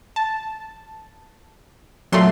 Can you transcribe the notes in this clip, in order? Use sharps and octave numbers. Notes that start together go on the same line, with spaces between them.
A5
A#2 F#3 A3 C6